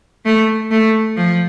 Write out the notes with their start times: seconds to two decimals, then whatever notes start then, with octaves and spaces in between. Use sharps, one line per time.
0.25 A3
0.71 A3
1.17 F3